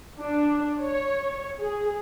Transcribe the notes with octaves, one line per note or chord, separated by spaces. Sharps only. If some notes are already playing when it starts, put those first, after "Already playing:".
D4
C#5
G#4